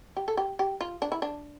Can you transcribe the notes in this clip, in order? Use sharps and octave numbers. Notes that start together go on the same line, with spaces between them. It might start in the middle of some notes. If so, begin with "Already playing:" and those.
G4
A4
G4
G4
F4
D4
E4
D4